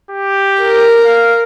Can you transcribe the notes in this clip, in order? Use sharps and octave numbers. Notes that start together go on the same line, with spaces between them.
G4
A#4
F5